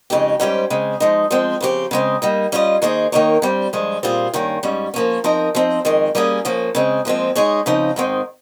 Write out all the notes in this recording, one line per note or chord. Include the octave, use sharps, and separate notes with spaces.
F2 C#3 G#3 D#4 G4
G#2 G3 C#4 G4 C5
C#3 G#3 C4
F3 G#3 D#4
F3 G#3 C4
C#3 F3 C4 G4
C#3 G#3 C4
G3 A#3 D#4
G3 C#4 F4 C5 D#5
D#3 A#3 D#4 G#4 C5
D#3 A#3 D#4 A#4 C#5
G2 G3 C4
G2 F3 G#3
A#2 G3 C4 F4 G#4
G2 D#3 A#3 C#4
G#2 G3 C#4
F3 A#3 C#4
F3 C4 D#4 A#4 D#5
F3 C4 D#4
F2 D#3 G#3
G3 A#3 C#4 F4 G#4
F3 A#3 C#4
C#3 G#3 C4
A#2 F3 G#3 C4
G#3 D#4 G#4 C#5
C#3 F3 C4 D#4
G#2 D#3 G#3 C4